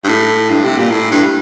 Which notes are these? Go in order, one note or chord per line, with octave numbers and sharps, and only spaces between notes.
G2
A2
G2
C3
A#2
A2
G2